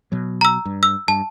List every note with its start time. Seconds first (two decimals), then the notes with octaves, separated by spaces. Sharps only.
0.12 B2 F#3
0.41 A#5 E6
0.65 G2
0.83 E6
1.08 G2 A5